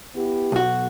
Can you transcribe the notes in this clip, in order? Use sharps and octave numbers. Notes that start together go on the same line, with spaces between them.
B3 E4 G4
B1 F#4